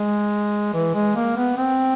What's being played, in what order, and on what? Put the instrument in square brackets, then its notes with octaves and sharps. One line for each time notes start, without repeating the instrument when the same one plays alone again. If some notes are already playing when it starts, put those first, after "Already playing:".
Already playing: [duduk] G#3
E3
G#3
A#3
B3
C4